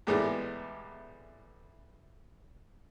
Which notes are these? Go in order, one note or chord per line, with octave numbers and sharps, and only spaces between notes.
E2 A2 G3 G#3 B3